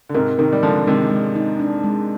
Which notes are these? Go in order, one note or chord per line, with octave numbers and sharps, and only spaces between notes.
D3
G#2 C3 A#4
C3 D#3 A#4
G3
D3 F3 G#3
C3 D#3 G#3
G#3
D#4
D4
G#3